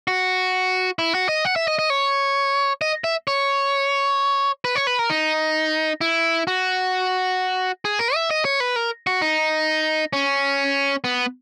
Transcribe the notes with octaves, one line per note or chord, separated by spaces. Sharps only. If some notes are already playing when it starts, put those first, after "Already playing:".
F#4
E4
F#4
D#5
F#5
E5
D#5
D#5
C#5
D#5
E5
C#5
B4
C#5
B4
A#4
D#4
E4
F#4
G#4
A#4
E5
D#5
C#5
B4
A#4
F#4
D#4
C#4
B3